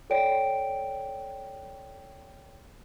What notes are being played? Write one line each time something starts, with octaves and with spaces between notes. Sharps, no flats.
A4 C#5 D5 G5 D7